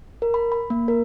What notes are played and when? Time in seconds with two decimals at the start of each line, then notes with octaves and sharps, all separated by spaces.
0.22 A#4
0.34 B5
0.52 B5
0.70 A#3
0.88 A#4